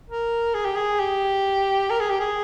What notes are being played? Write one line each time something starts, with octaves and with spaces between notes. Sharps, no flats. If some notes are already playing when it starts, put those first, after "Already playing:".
A#4
G#4
G4
G#4
G4
A#4
G#4
G4
G#4